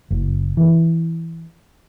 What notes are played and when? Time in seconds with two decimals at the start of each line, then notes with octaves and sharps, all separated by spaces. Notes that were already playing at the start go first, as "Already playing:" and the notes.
0.11 F#1
0.57 E3